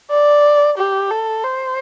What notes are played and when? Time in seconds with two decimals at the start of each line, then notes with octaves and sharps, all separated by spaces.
0.10 D5
0.77 G4
1.11 A4
1.44 C5